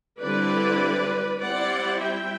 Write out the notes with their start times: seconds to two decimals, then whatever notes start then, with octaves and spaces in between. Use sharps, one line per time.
0.21 D3 G3 C4 E4 B4 D5
1.42 G3 C4 E4 D5 F#5
2.02 E5 G5